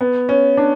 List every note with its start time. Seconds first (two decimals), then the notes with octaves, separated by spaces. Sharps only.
0.01 B3
0.29 C#4
0.57 D4